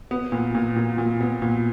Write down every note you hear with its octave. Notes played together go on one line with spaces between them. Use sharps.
B3
A#2
A#2
A#2
A#2
B3
A#2